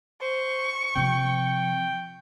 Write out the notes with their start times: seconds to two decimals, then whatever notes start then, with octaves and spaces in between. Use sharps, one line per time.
0.22 C5 C#6
0.96 C3 F3 G5